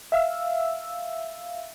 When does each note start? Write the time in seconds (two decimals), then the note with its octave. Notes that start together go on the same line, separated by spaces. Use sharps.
0.12 E5 F5 E6